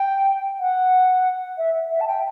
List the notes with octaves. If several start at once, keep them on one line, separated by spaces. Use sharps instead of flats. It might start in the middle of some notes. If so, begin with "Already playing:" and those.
Already playing: G5
F#5
E5
E5
A5
G5